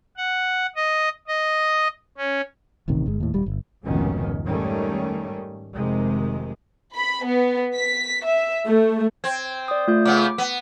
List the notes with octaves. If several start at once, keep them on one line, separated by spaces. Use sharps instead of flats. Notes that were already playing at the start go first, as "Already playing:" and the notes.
F#5
D#5
D#5
C#4
D#1 A1 C3 D#3
G1 G#3
D#2 A2
D#1 G3
G1
F1 C#2 G#2 B2 D#3 C#4
G#2 D#3 G3 A3 C#4
F1 C3 D#3 G#3
B5
B3
B6
E5
A3
C4 G#6
D5 D#6
A3 F4 G6
C#3 B3 D6
B3